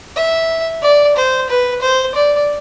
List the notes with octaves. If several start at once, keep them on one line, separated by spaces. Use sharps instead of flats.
E5
D5
C5
B4
C5
D5